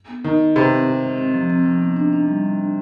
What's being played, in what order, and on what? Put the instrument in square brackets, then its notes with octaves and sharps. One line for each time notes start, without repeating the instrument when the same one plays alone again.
[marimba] B3
[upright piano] D#3 [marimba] D#4
[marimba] D#3
[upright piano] C3 [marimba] B4
[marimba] C4
G4
G#3
C4
F3
C4
F3
B3
D4
D4
G3
D4
D4